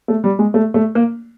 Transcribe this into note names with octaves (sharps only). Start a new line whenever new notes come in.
A3
G3
G#3
A3
A3
A#3